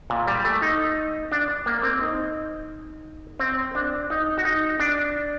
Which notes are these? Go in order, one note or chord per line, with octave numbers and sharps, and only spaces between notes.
A#2
G3
A3
D#4
D4
A#3
C4
D#4
C4
D4
D#4
F#4
D#4
D4